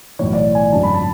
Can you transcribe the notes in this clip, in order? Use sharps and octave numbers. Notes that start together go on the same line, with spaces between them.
B1 A2 E3 C#5
D5
C#5
G#5
G#1 F#2 D3 A5
B5
A5